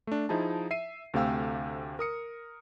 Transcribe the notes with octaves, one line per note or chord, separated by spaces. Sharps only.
A3 D4
F3 D#4 E4 G#4 A5
E5 C7 D#7
D2 C3 A3 F5 G5 E6
A#4 D#6 C#7